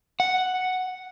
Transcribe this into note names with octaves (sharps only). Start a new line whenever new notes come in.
F#5